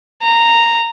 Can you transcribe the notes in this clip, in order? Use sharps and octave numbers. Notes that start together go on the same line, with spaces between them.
A#5